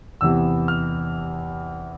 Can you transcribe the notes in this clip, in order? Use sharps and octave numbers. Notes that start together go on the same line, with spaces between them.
E2 C3 E3 B3 E6
F6